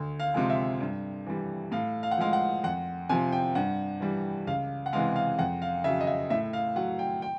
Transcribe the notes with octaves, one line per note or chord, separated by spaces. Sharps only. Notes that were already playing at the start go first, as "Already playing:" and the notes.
Already playing: D2
F5
C3 F3 G#3
E5
G2
E3 G3
A2 F5
F5
F#5
F3 G#3 F5
F#5
F2 F#5
C3 F3 G#5
G5
G2 F#5
E3 G3
C#2 F5
F#5
C3 E3 G#3 F5
F5
F2 F#5
F5
C#3 F#3 E5
D#5
E5
A2 E5
F5
F#3 F#5
G5
G5